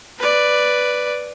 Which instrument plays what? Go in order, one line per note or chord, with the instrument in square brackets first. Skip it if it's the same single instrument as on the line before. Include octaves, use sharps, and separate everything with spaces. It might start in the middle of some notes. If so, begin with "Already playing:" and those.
[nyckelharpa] B4 D5